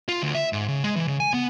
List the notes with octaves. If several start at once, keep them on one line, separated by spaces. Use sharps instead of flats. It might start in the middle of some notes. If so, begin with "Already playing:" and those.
F4
D2
E5
G#2
C#3
G#3
E3
C#3
G#5
B3